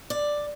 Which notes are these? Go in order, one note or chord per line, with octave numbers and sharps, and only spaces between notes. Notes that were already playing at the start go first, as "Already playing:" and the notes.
D5